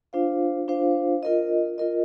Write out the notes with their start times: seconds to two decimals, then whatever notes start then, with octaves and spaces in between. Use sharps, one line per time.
0.13 D4 F4 C5 F5
0.68 D4 F4 C5 F5
1.23 F4 A#4 D#5
1.78 F4 A#4 D#5